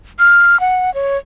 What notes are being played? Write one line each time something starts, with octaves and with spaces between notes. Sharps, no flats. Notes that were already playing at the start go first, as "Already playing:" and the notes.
F6
F#5
C#5